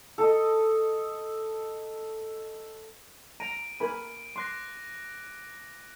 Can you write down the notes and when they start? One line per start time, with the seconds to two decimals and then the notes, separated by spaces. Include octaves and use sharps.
0.18 A4 D#5
3.40 A#5 D7 D#7
3.80 A#4 G#5 B5
4.36 C6 D6 F#6 A#6